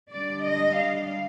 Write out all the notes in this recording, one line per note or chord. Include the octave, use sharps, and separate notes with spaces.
D3 G3 D4 D5
D#5
F5